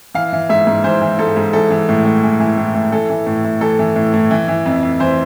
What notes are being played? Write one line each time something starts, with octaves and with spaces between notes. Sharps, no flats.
E3 F5
E3
G#2 E5
G#2
E3 C5
E3
G#2 A4
G#2
E3 A4
E3
A2
A2
E3
E3
A2
A2
E3 A4
E3
A2
A2
E3 A4
E3
A2
A2
E3
E3
F2
F2
E3 C5